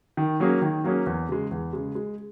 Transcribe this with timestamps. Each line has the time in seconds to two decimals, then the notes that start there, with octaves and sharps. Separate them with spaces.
0.17 D#3
0.40 F#3 A#3 C#4 G#4
0.62 D#3
0.84 F#3 A#3 C#4 G#4
1.06 E2
1.29 C#3 G#3
1.51 E2
1.73 C#3 G#3
1.95 G#3